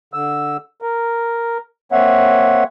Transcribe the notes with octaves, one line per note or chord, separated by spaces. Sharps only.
D3 E6
A#4
A#3 C4 C#5 E5 F#5